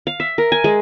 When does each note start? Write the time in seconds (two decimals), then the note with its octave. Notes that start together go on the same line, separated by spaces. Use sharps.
0.07 F5
0.20 E5
0.38 A#4
0.52 G#5
0.64 G#3